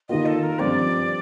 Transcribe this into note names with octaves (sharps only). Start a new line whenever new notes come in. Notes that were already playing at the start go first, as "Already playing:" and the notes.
D#3 A#3 F4 D#5
A4
A#4
G2 F3 C4 D5